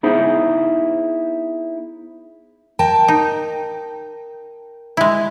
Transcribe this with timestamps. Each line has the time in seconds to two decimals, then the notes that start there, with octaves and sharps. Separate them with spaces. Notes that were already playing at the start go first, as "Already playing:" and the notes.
0.03 B3 D#4 E4 G#4 C5
2.79 A#4 G5 A5
3.08 D#4
4.97 G#3 E4